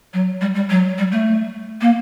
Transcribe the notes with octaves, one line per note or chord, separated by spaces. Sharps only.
F#3
G3
G3
F#3
G3
A3
A#3